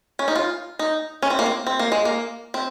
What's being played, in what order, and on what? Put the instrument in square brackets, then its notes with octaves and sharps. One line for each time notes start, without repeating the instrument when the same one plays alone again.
[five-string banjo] C#4
D#4
F4
D#4
C#4
C4
A#3
C4
C4
A#3
G#3
A#3
C4